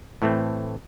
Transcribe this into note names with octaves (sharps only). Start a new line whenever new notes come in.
A2 E3 A3 C4